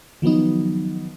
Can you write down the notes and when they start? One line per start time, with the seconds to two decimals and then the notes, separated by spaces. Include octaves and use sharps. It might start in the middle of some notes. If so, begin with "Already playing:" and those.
0.22 D#3 F3 F#3 B3 D#4